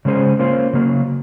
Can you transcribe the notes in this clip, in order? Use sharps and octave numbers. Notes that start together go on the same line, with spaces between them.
C#3 G#3 C#4 G#4 C5
A#3 C#4 F4 C5
C#3 F#3 A#3